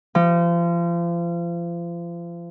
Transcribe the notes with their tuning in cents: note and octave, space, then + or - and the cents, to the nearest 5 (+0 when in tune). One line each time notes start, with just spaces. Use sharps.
F3 -35